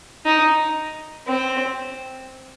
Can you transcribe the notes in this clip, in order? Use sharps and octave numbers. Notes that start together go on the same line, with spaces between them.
D#4
C4